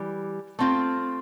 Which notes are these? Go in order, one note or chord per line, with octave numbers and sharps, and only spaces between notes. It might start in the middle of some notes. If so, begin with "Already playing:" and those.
Already playing: E3 G3
A3 C4 F4